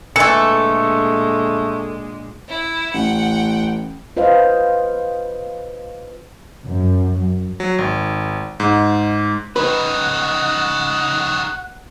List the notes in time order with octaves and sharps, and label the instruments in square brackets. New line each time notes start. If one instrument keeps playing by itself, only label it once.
[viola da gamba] A#2 D3 G#3 [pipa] E3 A3 [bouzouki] A4 [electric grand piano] C#7
[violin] E4
[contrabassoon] A1 [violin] F#5 G5
[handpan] F4 B4 C5 D#5 F5
[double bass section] F#2
[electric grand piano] F#3
G#1
G#2
[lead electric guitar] C#3 D#4 [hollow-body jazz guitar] B4 [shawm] F#5